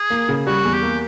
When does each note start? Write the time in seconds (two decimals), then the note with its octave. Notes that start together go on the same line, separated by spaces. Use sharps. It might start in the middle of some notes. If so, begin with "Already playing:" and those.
Already playing: G#4
0.10 A#3
0.29 C#3
0.47 G3 F#4
0.65 E2
0.74 G4
0.83 A#3